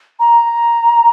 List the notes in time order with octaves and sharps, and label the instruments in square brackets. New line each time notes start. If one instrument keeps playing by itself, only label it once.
[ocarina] A#5